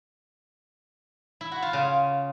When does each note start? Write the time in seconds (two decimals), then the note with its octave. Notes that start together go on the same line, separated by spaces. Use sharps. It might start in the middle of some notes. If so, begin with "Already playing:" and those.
1.41 E4
1.52 F#4
1.62 F4
1.73 C#3